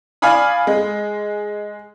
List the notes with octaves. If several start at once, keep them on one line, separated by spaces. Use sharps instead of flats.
D5 F5 G#5 B5 D#6
G#3